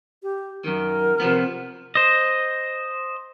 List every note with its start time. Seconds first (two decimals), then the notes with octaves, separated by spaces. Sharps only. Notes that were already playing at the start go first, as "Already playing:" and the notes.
0.23 G4
0.64 F#2 D#3 A#4
1.20 C3 F3 B3
1.95 C5 D#5